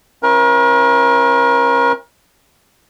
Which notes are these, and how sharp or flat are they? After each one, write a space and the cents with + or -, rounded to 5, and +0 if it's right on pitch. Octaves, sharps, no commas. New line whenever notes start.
C#4 -45 E4 +10 A#4 +35